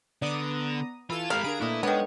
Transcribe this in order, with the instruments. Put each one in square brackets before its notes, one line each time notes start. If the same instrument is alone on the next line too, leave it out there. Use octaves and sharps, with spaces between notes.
[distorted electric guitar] D3 [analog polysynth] B3 A#5 D#6 [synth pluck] D5 D6
[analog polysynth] E3 A4 E7 [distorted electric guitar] F4 [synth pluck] B5 G#6
[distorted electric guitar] G#3 A#4 [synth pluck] G4 A4 C7 [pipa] F5 [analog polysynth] B5
[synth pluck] D3 A#4 [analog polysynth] D4 A#5 D7 [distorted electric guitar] G#4
[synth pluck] A#2 A#3 D4 [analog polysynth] A3 B4 D#5 [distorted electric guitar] E4
[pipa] D#3 B3 [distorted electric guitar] G#3 [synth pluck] D4 A4 [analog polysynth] C#5 C#6